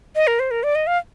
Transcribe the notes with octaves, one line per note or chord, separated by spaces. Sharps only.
D#5
A#4
C5
A#4
D5
D#5
F5